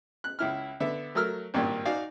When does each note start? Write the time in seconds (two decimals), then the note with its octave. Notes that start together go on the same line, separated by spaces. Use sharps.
0.24 F#6
0.39 C#2 E4 F6
0.80 D3 B3 E5
1.15 F#3 A3 A#4 E6 F6
1.54 G#1 G2 A#2 A#3
1.85 D#4 F#4 D5 F5 G#5